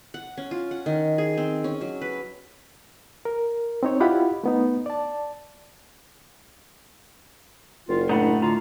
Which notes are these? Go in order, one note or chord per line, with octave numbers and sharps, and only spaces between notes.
F#5
C#4
F4
F#5
D#3
G#4
C4
C#4
F#3
B4
A#4
C4 D#4 C#5
E4 F4 G4 D#5 F#5 B5
A3 B3 D#4
D5 A5
F#1 F4
A2 D4 D#4 F#5 B5
D3 F4 A#5